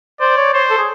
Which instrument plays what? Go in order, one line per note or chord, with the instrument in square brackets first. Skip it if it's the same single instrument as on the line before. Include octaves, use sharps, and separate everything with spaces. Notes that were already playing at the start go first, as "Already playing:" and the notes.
[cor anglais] C5 [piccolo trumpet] D5
[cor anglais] C#5
[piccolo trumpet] C5 [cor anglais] C#5
[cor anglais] A4
G#4